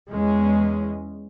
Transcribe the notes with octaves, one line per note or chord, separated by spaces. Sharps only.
E2 G#3 C#4